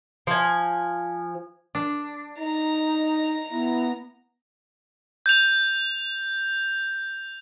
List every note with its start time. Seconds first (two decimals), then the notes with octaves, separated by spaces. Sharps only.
0.27 F3 G#5
1.75 D4
2.39 D#4 A#5
3.51 B3 E4
5.26 G6 F7